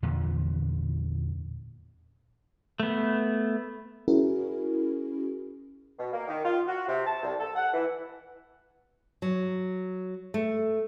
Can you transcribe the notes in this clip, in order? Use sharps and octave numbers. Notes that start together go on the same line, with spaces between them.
E2 A#2 D3 F3
A3 B3
C#4 E4 F#4 G#4 A#4
B2
A#3
D#3
F4
F#4
C3
A5
C2
A4
F#5
E3
F#3
A3